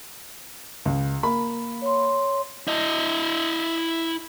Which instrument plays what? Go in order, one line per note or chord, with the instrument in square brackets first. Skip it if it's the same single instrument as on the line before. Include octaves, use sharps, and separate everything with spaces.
[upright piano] C#2
A#3 B5
[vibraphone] C#5 C6
[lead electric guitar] E4 D#5